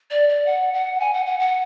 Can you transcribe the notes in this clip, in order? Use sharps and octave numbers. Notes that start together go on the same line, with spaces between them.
D5
D5
F#5
F#5
G#5
F#5
F#5
F#5